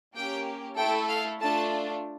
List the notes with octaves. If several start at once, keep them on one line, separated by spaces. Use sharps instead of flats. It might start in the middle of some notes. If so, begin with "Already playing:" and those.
A#3 C#4 G4 G5
A3 E4 A4 G5
F5
A3 D4 F4 A5